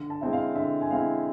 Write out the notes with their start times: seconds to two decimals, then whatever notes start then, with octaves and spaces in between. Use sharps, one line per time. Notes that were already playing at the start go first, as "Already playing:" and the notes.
Already playing: D3
0.10 A5
0.21 G#3 C4 E4
0.33 F5
0.55 D3 E5
0.81 G#5
0.90 G#3 C4 E4 F5